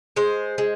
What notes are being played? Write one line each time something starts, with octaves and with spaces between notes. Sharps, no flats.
G#3 C5
G#3